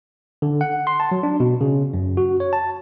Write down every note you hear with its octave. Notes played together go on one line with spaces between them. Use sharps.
D3
F#5
C6
A5
F#3
D4
B2
C#3
F#2
F#4
C#5
A5